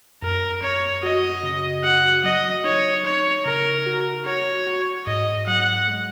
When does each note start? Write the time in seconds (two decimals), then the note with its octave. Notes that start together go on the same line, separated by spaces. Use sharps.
0.22 F#2 A#4
0.63 F#2 C#5
1.03 F#4 D#5
1.43 C#3
1.84 F#4 F#5
2.24 F#3 D#5
2.64 D#4 C#5
3.05 D#4 C#5
3.45 C#3 A#4
3.86 F#4
4.26 F#4 C#5
4.67 F#4
5.07 G#2 D#5
5.47 F#3 F#5
5.88 G#3